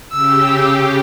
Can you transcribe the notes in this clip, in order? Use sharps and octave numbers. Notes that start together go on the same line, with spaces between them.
C#3 G4 E6